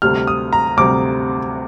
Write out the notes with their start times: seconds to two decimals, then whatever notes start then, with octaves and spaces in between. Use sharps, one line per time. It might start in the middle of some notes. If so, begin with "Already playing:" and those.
0.02 D2 C3 G3 F6
0.27 D#6
0.53 A#5
0.77 D2 C3 G3 D6